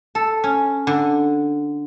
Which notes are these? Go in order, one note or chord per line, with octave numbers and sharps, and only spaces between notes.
A4
C#4
D3